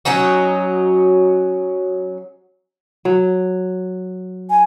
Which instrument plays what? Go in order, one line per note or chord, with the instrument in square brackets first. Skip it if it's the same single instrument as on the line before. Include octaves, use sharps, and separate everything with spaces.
[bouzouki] F#3 C#4 D#4 F#4
[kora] F#3
[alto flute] G#5